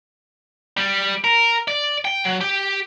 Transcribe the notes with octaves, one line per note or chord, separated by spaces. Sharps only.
G3
A#4
D5
G5
F#3
G4